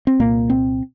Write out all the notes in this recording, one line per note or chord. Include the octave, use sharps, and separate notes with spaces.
C4
C2 A#2 A#3
C4